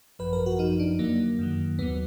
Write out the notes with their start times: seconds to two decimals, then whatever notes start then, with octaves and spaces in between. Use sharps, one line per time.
0.19 G#1 F#2 F3 B4
0.33 A#4
0.46 F#4
0.59 F#2 F3 D#4
0.79 D4
0.99 F2 D3 F#3 A#3
1.39 F#2 D#3 F#3
1.79 D#2 D3 F#3 B3